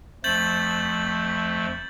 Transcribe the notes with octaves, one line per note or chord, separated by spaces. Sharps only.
F2 F3 A3 G6 A6 F#7